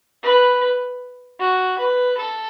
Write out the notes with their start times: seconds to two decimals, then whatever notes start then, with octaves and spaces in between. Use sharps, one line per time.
0.23 B4
1.39 F#4
1.78 B4
2.17 A4